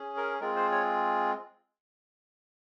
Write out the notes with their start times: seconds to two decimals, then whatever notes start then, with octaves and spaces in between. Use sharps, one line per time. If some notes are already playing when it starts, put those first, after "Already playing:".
Already playing: C#4 G#4
0.17 A#4
0.40 G#3 C4 F4 G#4 A#4
0.56 C5
0.72 C#5